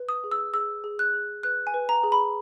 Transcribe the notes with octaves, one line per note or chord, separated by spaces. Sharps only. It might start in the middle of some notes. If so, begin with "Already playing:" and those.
Already playing: B4
D#6
G#4
E6
G#4 E6
G#4
F#6
G#4
B4 F#6
G#5
B4
A#5
G#4
B5